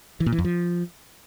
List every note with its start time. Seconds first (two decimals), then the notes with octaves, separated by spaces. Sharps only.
0.20 E3
0.26 A#2
0.32 E3
0.38 F2
0.45 F3